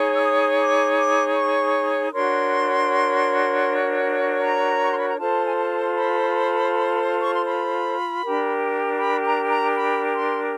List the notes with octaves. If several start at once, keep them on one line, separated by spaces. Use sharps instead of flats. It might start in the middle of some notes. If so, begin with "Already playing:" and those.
Already playing: D#4 G#4 C#5
E6
D#6
D6
D6
C#6
D4 F#4 A#4 C#5 C6
A#5
C#6
C6
B5
A#5
F4 A4 C5 A5
G#5
A5
B5
C#6
C6
B5
D4 G4 A#4
B5
A#5
A#5
B5
C6